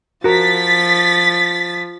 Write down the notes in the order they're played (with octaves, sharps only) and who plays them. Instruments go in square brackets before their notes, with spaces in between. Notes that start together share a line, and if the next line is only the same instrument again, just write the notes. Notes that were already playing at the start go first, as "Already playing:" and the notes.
[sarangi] F3 [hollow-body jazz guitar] F#4 A#4 [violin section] A6 B6